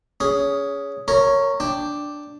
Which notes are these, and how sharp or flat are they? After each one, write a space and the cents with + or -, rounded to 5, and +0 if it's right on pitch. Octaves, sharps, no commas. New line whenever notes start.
C#4 +20 G#4 +0
A#4 -20 C#5 +0 A#5 +35
D4 +0 G5 +0